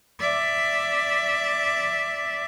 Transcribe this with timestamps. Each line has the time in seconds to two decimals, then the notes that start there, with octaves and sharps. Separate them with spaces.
0.20 D5 E5